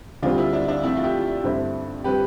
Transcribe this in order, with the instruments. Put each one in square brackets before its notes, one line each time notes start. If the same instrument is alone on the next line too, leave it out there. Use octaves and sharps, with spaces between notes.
[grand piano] D2 D3 G3 C4 [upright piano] D4 F4
[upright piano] E4
D4
D4
[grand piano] F2 D3 A3 [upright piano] E4
[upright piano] F4
E4 G4
[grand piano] G2 D3 A3 C4 E4
[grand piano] D3 G3 C4 [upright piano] G4 B4